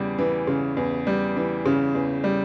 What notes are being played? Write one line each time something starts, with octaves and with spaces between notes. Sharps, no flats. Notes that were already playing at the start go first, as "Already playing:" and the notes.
Already playing: E2 C#3 G3
E3
C#3
E2
G3
E3
C#3
E2
G3